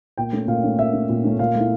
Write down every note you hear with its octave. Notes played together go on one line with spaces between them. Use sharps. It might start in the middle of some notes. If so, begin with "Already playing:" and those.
A#2 G5
A3 C#4
A#2 F5
A3 C#4
A#2 E5
A3 C#4
A#2
A3 C#4
A#2 F5
A3 E4